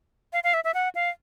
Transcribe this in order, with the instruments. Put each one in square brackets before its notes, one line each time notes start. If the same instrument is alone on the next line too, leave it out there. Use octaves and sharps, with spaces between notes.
[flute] F5
F5
E5
E5
F#5
F5